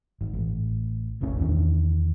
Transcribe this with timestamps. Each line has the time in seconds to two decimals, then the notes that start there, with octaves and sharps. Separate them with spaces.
0.21 G#1
0.34 A1
1.21 F1 A#1 A2 C#4
1.39 E2 D#3 C#4 D4